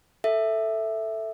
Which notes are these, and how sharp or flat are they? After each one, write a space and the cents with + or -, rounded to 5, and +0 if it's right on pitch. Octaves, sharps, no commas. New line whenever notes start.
A4 +5 E5 +0